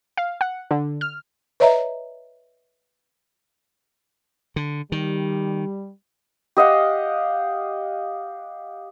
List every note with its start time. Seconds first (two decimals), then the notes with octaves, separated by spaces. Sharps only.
0.17 F5
0.41 F#5
0.71 D3
1.01 F6
1.60 B4 C#5 D#5 E5 A#5
4.56 D3
4.92 D#3 G3
6.57 G4 D#5 F5 F#5